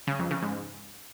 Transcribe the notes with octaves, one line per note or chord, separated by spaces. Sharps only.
C#3
F2
C#3
G#2